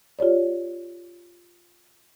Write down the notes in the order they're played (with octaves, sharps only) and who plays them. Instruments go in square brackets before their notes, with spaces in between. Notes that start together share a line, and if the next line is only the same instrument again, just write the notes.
[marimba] F4 G4 C#5 D5